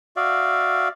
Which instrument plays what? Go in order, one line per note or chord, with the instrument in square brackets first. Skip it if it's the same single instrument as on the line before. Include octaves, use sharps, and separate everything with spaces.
[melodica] F#4 D5 E5 F5